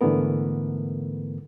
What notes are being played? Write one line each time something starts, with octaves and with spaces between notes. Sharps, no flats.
G#2 D3 E3 A3 B3 A#4